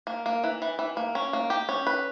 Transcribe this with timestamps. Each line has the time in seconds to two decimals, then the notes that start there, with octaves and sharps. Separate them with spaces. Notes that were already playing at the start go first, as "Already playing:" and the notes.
0.07 A#3
0.26 A#3
0.44 E3
0.62 E3
0.79 E3
0.97 A#3
1.15 C#4
1.33 A#3
1.50 G4
1.69 C#4
1.87 B4